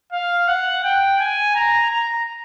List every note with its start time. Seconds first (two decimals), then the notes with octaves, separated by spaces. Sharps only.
0.12 F5
0.48 F#5
0.84 G5
1.20 G#5
1.55 A#5
1.91 A#5